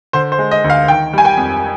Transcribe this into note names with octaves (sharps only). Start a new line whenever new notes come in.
D3 C5
C5
G#3
D#5
D2
F5
D#3 G5
G3 G#5
G5
F2